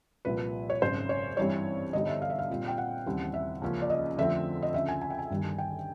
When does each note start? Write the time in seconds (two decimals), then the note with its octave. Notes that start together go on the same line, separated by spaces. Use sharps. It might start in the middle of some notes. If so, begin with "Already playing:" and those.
0.25 C2 A#2 F3 B4
0.70 C#5
0.82 G#1 F#2 C#3 C5
1.09 C#5
1.37 G2 E3 G3 C4 C#5
1.93 G2 D3 G3 B3 D#4 D#5
2.07 E5
2.22 F5
2.30 E5
2.39 F5
2.50 A#2 G3 C4 F4
2.68 G5
2.78 F#5
3.06 D#2 C#3 E3 G3 C4
3.34 E5
3.62 C#2 C#3 F3 A#3 C#4
3.82 D5
3.90 D#5
4.18 F2 D3 F3 A3 C4 E5
4.63 D#5
4.74 D2 C#3 F3 E5
4.89 G#5
5.02 G#5
5.10 G5
5.19 G#5
5.30 G1 G2 D#3 G3
5.58 G5